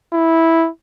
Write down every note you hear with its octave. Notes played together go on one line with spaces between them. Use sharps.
E4